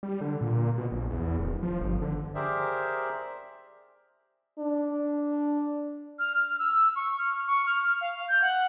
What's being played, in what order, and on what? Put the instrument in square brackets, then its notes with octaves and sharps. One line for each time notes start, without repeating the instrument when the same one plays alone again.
[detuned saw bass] G3
D3
A#2
B2
A#1
E2
D1
F3
G1
D3
[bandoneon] G4 G#4 A#4 C5 D5 E5
[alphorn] D4
[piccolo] F6
E6
C#6
F6
C#6
F6
F5
G6
F#5